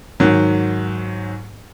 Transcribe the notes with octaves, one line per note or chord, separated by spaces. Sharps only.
G#2 D#3 F#3